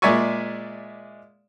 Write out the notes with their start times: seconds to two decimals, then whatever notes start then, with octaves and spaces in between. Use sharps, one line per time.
0.02 A#2 G#3 D5 E5 G#5 C#6